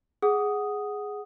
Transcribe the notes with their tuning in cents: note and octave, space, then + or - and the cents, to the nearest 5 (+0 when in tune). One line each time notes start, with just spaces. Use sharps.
G#4 +0 F#5 +0 D#6 +0